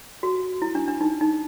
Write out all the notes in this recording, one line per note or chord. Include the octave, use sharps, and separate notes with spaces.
F#4
E4
D4
D4
D#4
D#4